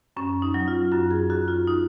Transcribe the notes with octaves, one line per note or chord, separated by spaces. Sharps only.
F#2 C#4
D#4
F#3
F4
F#2 F#4
G#4
F#2 F#4
F4
D#4